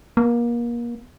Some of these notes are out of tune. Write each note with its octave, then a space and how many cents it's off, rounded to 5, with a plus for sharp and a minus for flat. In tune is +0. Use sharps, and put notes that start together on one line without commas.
A#3 +30